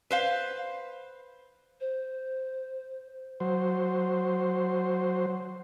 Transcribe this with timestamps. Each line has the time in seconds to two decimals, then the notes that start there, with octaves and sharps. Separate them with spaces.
0.10 B4 C5 F5
1.80 C5
3.40 F#3 C5